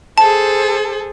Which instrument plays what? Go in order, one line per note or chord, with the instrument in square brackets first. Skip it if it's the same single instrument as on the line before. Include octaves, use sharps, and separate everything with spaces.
[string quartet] G#4 A4 C5 [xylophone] A5